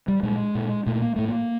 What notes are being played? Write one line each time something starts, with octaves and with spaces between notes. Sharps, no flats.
G3
A#2 G#3
A#2
A#2 A3
A#3
A2 A3
A#3